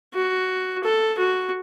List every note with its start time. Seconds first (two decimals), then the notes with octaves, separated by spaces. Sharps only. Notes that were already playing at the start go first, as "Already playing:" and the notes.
0.14 F#4
0.84 A4
1.18 F#4